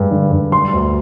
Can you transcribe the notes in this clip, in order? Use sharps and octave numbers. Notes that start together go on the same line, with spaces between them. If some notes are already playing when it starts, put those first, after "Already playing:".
Already playing: G2 G#3
D3
G2
G3 C6
D2